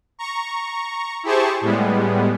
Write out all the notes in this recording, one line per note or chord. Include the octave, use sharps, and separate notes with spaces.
A#5 C#6
E4 G4 G#4 C5 A5 C#6
A2 G3 G#3 B3